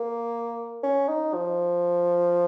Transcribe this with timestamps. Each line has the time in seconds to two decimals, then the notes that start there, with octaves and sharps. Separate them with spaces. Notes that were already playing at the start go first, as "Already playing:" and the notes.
Already playing: A#3
0.83 C#4
1.09 D#4
1.34 F3